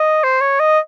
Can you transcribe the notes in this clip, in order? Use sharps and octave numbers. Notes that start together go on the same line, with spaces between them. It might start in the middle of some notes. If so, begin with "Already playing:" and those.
Already playing: D#5
C5
C#5
D#5